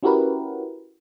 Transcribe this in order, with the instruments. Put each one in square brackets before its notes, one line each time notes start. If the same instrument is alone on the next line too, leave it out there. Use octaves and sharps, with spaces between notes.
[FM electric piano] C#4 E4 F#4 G4 A#4 B4